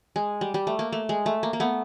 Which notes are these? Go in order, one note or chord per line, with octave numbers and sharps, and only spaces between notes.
G#3
G3
G3
A3
A#3
A3
G#3
A3
A#3
A#3
A3 B3